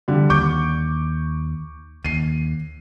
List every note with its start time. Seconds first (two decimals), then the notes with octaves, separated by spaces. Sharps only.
0.08 D3 G3
0.30 D#2 C#6 D6 G6
2.04 D#2 C7 D#7